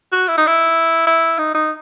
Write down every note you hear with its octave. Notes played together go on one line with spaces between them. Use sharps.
F#4
E4
D#4
E4
E4
D#4
D#4